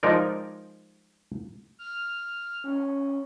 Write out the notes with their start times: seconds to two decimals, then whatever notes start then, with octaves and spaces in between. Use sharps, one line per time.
0.03 F3 G#3 D#4 A#4 D5
1.79 F6
2.64 C#4